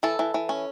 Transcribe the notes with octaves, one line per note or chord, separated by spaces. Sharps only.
E3 A4
E3
E3
C#4